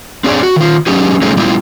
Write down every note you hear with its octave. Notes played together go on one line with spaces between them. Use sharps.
C4 D4 G#4 C#5 D5
F#4
D#3 F4
F#3 C#4 D#4 G4 G#4
F#3 G3 A3 C#4 D#4 G#4
G3 B3 E4 F4